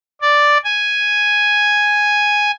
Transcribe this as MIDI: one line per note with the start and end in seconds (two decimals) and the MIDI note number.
0.21 0.57 74
0.64 2.51 80